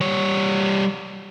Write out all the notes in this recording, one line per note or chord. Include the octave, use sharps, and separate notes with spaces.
G3 C#5